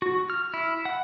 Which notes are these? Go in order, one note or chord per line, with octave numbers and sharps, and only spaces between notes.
F#4
F6
E4
F#5